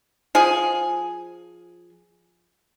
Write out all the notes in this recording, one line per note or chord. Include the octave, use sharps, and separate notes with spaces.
F3 G#4